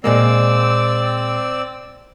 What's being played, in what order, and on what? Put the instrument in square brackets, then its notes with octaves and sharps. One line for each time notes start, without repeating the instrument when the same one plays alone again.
[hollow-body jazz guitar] A#2 G#3 A#3 [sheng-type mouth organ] C4 D5 E6